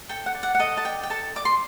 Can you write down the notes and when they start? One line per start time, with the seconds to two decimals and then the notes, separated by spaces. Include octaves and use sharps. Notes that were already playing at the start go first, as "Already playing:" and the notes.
0.09 A4 G5
0.26 F#5
0.34 D5
0.43 F#5
0.55 F#5
0.59 A4 D#5
0.77 A5
0.85 D5 G5
1.03 G5
1.10 A4 A5
1.36 D5 D6
1.45 C6